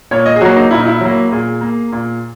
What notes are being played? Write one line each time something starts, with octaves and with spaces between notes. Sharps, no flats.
A#2 C#5
D#5
G#4
F#3 A#3 F#4
D#4
A#2 E4
D#4
E4
F#3 A#3
A#2 G#4
A#3
A#2